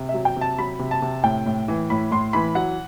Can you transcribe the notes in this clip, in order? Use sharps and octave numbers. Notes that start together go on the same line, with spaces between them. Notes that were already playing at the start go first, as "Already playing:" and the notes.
Already playing: C3
E5
F#3
G5
C3
A5
F#3 B5
C3
A5
C3
A2 G5
A2
E3
A2 B5
A2 C6
E3 B5
F#3 F#5